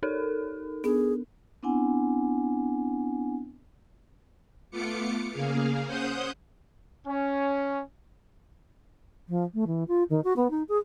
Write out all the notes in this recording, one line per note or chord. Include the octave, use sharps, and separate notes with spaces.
D#4 A4 A#4
B3 D4 G#4
B3 C4 D4 E4 F#5 G#5
A3 B3 F4 D6 C#7
C#3 A#3 G#4 F5
C#4 C5 F#5 D#6 G6
C#4
F3
A3
E3
F4
D#3
F#4
B3
D#4
G#4